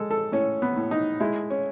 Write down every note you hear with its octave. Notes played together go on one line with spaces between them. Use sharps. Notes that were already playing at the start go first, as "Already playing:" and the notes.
Already playing: G#3 A4
A4
A2 C#4
B3
A2
D#4
G#3 E4
C#4